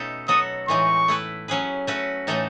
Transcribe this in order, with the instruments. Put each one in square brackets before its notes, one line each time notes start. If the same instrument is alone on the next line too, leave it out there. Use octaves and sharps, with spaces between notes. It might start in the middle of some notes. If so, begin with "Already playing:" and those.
Already playing: [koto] B2 A3 C#4 D#4 A4
[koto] F#3 B3 F#4 A4 [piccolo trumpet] D#6
[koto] A2 E3 G#3 D#4 [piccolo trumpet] C#6
[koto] A3 E4 B4
F#3 C#4 G#4 B4
A3 C#4 F#4 B4
A2 E3 A3 D#4 A4